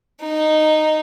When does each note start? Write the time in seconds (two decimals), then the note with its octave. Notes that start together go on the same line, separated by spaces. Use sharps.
0.21 D#4